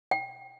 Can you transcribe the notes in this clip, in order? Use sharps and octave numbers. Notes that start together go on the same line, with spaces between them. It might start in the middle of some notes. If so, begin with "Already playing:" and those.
G5